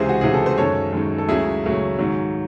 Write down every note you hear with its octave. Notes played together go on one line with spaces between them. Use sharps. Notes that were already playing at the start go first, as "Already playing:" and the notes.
Already playing: C#2 C3 E3 G#4 C5
F#4
C#2 C3 E3 G#4
A4
C5
F#2 D#3 G#3 A4 C#5
F#2 D#3 G#3
A4
C#2 C#3 F#3 A3 E4 G#4
C#2 C#3 F#3 A3
G#2 D#3 F#3